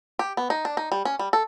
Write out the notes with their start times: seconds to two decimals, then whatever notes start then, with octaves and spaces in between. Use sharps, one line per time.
0.19 G4
0.37 B3
0.50 D#4
0.65 D4
0.77 D#4
0.92 G3
1.05 C#4
1.19 G3
1.33 A4